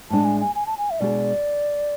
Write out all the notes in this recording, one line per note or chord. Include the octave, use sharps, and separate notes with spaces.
A2 G#3 D4 A5
G#5
G#5
G#5
A5
G#5
E5
B2 G#3 D4 G#4 D5